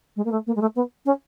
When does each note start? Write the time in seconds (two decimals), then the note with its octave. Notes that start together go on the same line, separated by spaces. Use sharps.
0.16 G#3
0.25 A#3
0.31 A3
0.46 A#3
0.55 G#3
0.61 A3
0.75 B3
1.05 C#4